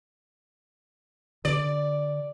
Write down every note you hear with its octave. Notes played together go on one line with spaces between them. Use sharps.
D3 D5